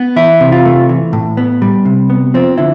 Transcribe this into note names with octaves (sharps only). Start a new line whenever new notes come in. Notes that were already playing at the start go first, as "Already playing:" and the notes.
Already playing: B3
E3 E4
C3
F4
A3
E3
A2
B3
G3
C3
B3
F3 C4
D3 E4